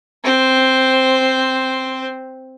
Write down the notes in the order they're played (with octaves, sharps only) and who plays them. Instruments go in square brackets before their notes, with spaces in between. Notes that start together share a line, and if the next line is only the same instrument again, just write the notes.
[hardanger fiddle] C4 C5